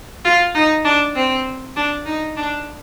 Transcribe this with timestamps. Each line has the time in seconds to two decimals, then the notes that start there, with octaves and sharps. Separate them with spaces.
0.25 F4
0.55 D#4
0.85 D4
1.15 C4
1.76 D4
2.06 D#4
2.37 D4